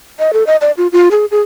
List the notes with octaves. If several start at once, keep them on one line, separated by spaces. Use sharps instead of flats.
D#5
A4
D#5
D5
F4
F4
G#4
G#4